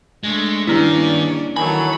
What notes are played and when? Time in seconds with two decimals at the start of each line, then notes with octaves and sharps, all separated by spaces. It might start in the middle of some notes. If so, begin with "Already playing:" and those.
0.24 G#3 A3 D4
0.67 G2 D#3 A#3 C#4 D4 E4 D5
1.56 D#3 E3 F#3 A4 G#5 B5